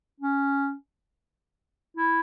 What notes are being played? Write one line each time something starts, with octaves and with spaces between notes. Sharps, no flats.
C#4
E4